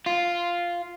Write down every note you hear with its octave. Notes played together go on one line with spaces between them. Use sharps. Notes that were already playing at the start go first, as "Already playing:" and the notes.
F4